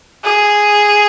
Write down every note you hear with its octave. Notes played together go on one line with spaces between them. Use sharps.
G#4